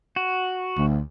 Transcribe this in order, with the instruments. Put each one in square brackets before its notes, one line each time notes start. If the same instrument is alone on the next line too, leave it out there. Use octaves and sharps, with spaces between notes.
[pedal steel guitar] F#4
[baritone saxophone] D2